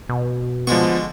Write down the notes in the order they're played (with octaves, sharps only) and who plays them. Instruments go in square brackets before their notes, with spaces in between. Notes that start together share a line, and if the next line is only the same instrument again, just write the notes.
[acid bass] B2
[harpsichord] D3 G#3 C#6 [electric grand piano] F3 B3